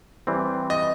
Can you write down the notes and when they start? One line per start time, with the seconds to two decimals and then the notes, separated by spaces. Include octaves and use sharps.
0.27 E3 G3 C4
0.70 D#5